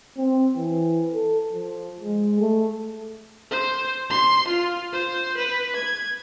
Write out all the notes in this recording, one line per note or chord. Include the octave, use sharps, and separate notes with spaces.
C4
E3
A4
F3
G#3
A3
C5
C6
F4
C5
B4
G#6